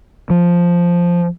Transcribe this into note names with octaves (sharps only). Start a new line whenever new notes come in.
F3